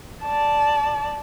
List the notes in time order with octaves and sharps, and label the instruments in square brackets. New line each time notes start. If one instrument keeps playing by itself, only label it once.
[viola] D5 A5